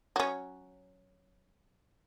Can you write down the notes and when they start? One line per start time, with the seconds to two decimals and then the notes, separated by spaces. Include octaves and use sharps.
0.16 F#3 C#4